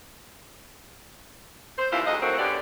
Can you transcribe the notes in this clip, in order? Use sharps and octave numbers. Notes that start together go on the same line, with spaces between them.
C5
D#2 E3 D4 E4 F4
D2 G#2 F#4 D#5
E3 F#3 A3 A#3 C4 F#4
G2 D3 B3 C#4 G4 D5